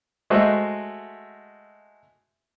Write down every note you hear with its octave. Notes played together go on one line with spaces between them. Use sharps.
G#3 A3 F#4 C5 D#5 E5